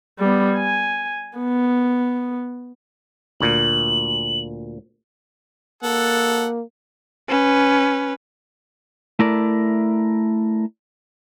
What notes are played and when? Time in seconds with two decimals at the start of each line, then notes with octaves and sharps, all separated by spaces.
0.19 G3 B3
0.57 G#5
1.38 B3
3.41 D2 A#2 F#7
5.83 A#3 A4 F#5
7.28 C#4 B4
9.19 A3 E4 A#4 D5